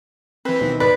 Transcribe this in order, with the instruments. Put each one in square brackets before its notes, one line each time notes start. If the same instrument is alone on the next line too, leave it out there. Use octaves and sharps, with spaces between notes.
[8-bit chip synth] E3 C4 [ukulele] B4
[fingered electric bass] B2 D#3
[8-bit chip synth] C2 G#2 D5 [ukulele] B4